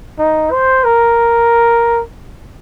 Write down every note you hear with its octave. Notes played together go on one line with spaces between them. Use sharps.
D#4
C5
A#4